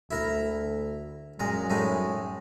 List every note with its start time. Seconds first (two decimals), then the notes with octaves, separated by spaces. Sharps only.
0.11 D2 E4 A#4 A#5
1.40 F#2 A#2 G#3 A#5
1.70 A2 G#3 D#4